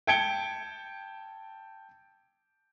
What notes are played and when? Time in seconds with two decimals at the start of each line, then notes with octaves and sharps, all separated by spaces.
0.07 G5 A5 G#6 C#7 D7 G7